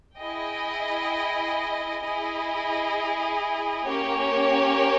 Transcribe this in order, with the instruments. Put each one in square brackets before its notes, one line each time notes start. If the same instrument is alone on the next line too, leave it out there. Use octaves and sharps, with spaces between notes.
[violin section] E4 G#4 D#5 G5
E4 G#4 D#5
A#3 C#4 G4 C#5